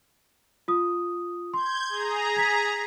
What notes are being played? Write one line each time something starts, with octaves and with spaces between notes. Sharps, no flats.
F4 D#6
C6 G6 G#6
G#4 A#5
G#6 B6